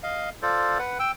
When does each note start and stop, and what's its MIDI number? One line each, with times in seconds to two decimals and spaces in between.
0.03 0.30 75
0.03 0.30 77
0.42 0.78 65
0.42 0.78 69
0.42 0.78 72
0.42 0.78 74
0.79 0.98 71
0.79 0.98 78
0.99 1.12 79
0.99 1.12 88